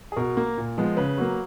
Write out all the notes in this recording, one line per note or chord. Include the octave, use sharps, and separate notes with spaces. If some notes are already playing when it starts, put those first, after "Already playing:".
G#4
B2 A#4
A#3
A#2
F3 G#3 B3
C#3 B4
F#3 A#3